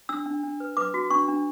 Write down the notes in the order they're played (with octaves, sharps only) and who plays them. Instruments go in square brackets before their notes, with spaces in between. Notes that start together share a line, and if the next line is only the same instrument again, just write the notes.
[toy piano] D4 E6
D4
D4
B4
B4 D6
F#4
D4 C#6
D4